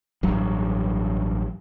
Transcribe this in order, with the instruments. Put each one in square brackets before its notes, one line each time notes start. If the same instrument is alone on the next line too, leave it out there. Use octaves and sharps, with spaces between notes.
[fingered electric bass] A1 G2 F#3